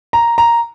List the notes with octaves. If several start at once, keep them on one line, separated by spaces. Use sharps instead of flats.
A#5
A#5